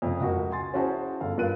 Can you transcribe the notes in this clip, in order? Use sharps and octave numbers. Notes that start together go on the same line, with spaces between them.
F2 C#3
C#2 F#4 A#4
G#5 C6 A6
C#4 E4 F#4 G#4 C5 A5
G1 A4 F5
G2 F4 A#4 B4 F#6 D#7